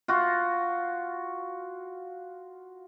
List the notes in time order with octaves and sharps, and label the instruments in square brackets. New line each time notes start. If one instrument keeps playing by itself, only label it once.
[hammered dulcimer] F4 F#4